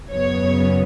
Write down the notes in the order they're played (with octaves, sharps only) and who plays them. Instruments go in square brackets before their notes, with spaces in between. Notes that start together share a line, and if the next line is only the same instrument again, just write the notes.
[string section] F#2 C#3 F#3 B3 C#5